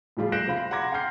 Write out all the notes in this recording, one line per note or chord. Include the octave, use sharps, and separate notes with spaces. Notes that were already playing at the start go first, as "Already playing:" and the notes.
A2 F3 G3 F4 G#4
F#6 G6 A#6 C7 D7 E7
C3 C4 F4 F5 B5
F#5 A#5 C6 D6 G#6 A#6
F#5 G5 C6 F6 G6 C7